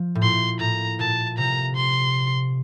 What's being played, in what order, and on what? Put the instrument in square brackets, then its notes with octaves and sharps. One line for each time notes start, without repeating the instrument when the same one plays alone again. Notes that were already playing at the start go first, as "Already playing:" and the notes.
Already playing: [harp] F3
A2
[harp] A#2 [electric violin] C6
[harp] A2 [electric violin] A#5
[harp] A#2 [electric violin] A5
[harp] C3 [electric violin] A#5
[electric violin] C6